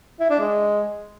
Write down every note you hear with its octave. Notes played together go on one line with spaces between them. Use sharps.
E4
D4
G#3